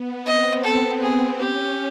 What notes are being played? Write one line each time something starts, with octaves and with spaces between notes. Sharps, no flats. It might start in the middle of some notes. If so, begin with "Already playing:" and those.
Already playing: B3
C4 D#5
A4
G#4
C#4 G4